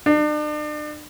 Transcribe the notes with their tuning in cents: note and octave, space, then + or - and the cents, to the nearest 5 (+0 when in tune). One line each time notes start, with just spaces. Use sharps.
D4 +40